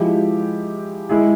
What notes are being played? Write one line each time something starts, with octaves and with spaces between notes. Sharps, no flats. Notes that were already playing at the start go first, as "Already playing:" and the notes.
Already playing: F3 G#3 E4 G4
G#3 E4 G#4